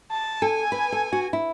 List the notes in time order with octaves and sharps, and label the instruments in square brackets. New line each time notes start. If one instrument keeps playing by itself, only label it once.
[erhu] A5
[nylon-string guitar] A4 [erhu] G#5
[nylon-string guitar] B4
A4
F#4
E4